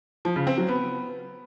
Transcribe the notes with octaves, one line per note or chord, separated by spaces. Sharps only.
F3
C#3
C4
F#3
B3